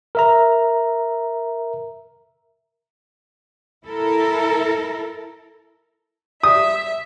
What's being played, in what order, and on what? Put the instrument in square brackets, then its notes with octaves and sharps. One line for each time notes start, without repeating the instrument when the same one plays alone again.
[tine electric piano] A#4 E5 A#5
[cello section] E4 A4 A#4
[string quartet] E5 [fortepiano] D#6